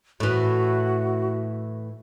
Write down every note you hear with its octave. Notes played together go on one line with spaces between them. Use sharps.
A2 E3 F#4